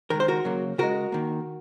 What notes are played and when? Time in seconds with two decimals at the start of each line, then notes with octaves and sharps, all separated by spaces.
0.10 D#3 G#3 A#4
0.20 C5
0.28 F#4 A#4
0.45 C#3 F#3 A#3
0.78 C#3 G#3 F#4 A#4
1.12 D#3 A#3